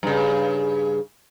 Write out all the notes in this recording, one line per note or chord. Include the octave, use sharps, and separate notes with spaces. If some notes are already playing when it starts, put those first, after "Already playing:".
G2 C#3